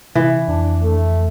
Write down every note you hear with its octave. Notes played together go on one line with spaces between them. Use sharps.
C3 E3
F2 D4
A3